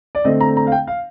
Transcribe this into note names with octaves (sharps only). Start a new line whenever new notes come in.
D5
D3 A3 C4 D#5
A#5
A#5
F5
G5
F5